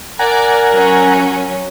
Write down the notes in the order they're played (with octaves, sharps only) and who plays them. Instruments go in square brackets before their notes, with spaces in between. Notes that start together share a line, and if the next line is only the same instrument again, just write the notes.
[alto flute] A#4 [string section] D5 [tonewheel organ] F#5 G#5 A#5
[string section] F#3 C#4